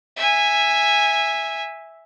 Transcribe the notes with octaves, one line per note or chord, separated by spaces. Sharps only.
E5 G#5